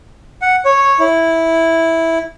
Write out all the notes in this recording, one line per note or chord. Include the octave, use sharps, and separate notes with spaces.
F#5
C#5
E4